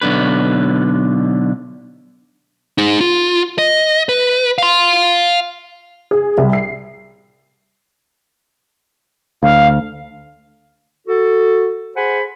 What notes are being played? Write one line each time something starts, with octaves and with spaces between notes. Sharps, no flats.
B1 D3 B4
D#4 G#4
F4
D#5
B4
F5 C6
G#4
C2
C7
D2 F5
F#4 A4
G#4 C5 F#5 G#5 B5